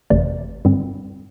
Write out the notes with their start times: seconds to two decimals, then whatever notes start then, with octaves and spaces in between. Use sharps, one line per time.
0.10 G1 F2 C3 E3 A3 D5
0.65 G2 D3 G3 C4